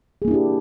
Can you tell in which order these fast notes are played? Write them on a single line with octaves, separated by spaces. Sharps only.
G#4 A#3 E4 D4 G4